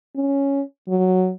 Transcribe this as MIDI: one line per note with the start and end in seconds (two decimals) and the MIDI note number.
0.16 0.62 61
0.88 1.32 54